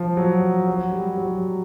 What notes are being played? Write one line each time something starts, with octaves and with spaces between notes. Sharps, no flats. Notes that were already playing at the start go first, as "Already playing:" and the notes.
Already playing: F3
F#3
F#3
G3
F#3